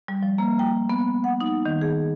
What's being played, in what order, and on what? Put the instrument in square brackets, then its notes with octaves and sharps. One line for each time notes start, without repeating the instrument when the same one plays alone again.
[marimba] G3
F3
A#3
G5
B3
F#5
D#4
D#3
G#4